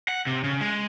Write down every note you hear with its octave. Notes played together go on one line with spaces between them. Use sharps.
F#5
C3
C#3
G#3